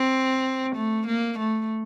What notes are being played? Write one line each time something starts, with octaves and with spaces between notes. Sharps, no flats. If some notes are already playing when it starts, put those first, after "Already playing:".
Already playing: C4
A3
A#3
A3